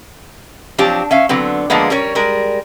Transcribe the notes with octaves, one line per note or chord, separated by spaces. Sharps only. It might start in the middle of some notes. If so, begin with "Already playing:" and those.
F3 F#3 C4 D4 G4
C#4 E5 F5
D3 F#3 B3 C4
D3 F3 G#3 A#3 B3
G3 C#4 A#4 C#5
G3 G#3 A#4